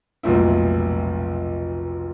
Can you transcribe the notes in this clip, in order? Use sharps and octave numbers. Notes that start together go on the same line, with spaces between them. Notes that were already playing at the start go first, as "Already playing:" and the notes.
F1 B1 A#2 E4